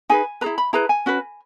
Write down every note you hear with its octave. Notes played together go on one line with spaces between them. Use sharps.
D#4 G#4 B4 G#5
E4 G#4 B4 A#5
B5
E4 G#4 B4 A#5
G#5
C#4 F#4 B4